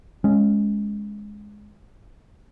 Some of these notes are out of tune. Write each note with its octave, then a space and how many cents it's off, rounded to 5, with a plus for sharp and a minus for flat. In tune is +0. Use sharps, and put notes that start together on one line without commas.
G#3 +0 C#4 +0